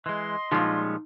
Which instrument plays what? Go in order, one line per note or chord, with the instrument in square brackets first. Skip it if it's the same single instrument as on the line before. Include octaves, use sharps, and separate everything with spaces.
[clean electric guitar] E3 G#3 [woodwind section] D#5 C6
[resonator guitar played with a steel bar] A#2 F3 [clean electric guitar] G3 G#3 C#4 [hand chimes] D#4